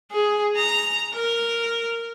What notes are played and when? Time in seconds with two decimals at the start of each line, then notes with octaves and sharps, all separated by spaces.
0.11 G#4
0.57 A#5
1.14 A#4